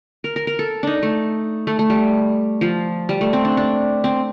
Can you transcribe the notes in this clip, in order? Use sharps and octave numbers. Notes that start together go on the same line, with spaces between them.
A#4
A#4
A#4
A4
D4 D#4
A3
A3
A3
G3
F3
G3
A3
C4
D4
D4
C4